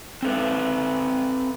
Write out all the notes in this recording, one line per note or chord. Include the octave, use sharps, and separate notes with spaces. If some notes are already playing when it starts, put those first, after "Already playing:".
C4 A4 B4